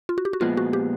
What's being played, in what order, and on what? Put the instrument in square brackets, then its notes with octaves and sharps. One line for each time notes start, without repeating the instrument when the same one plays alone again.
[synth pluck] F4
F#4
G4
F#4
[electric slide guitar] A#2 F3 G#3 B3 [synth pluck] F4
[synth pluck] F#4
G4